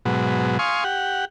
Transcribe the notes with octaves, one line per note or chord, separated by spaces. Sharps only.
G#2 B2 F#3
F5 G#5 C6 C#6 D#6
G4 F#5